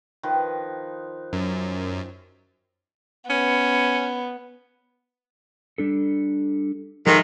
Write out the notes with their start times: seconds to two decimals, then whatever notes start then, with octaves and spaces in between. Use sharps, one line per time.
0.23 D#3 F3 B4
1.33 F#2
3.30 B3 C#4
5.78 G3 D4 A4
7.07 G#2 D#3 F3 A4 E5